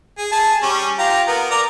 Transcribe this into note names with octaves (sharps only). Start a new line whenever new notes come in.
G#4
G#4 A5
G3 C#4
F4 G4 A#5
B3 A#4
A#4 D5 A#5